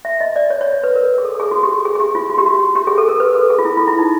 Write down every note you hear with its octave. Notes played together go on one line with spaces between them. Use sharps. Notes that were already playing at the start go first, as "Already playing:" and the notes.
E5
D#5
D5
C#5
C#5
B4
A#4
G#4
A4
A4
G#4
F#4
G4
G#4
G#4
G4
F4
F#4
G4
F#4
G4
G#4
A4
A#4
B4
A4
G#4
F4
E4
F4
E4
D#4